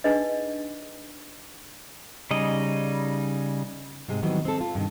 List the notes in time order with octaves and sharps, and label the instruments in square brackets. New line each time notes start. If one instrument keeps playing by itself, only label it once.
[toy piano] D4 D#4 G#4 B4 D#5
[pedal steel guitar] C#3 G3 D#4 D#5
[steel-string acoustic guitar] G#2 C3 G#3
D#3 E3 F#3 G3 B3 C4
C4 A4
F4
G2 B2 D#3